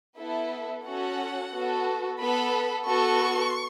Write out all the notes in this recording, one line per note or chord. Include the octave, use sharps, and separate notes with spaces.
B3 E4 A4 E5
C#4 F#4 A4 F#5
B3 F#4 A4
B3 A4 B5
B3 F#4 A4 C#6